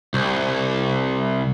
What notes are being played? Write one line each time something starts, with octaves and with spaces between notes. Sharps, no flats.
C2